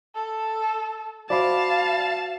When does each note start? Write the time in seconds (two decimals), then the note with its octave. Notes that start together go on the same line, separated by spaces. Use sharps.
0.15 A4
1.30 F#4 C5 D5 E5 F5 A5 B5 D6